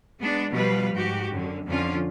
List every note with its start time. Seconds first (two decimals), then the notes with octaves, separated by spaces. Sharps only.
0.19 G#3 B3 D4
0.51 B2 F3 G3 B4 F5
0.95 G#2 F#4 G4
1.32 F#2 D3
1.67 F2 D3 C#4 F4